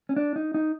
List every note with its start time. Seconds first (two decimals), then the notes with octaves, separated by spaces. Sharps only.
0.09 C#4
0.17 D4
0.36 D#4
0.54 D#4